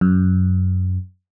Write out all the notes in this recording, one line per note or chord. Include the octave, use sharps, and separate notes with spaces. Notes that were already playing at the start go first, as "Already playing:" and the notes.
F#2